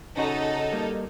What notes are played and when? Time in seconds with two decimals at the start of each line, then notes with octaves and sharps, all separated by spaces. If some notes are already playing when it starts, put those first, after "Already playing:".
0.17 C#3 C#4 D#4 F#4 A4
0.72 G3 A#3